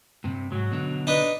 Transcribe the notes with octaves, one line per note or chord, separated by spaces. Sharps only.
G2 C3
G#2 F#3 F#4
B2 D3
D4 D#4 B4